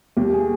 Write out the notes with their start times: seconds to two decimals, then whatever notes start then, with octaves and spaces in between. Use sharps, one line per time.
0.17 D#2 G4
0.33 G#4